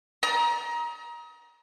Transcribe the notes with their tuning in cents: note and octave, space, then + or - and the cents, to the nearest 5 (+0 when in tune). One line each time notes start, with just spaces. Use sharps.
A#5 +25 D#6 +35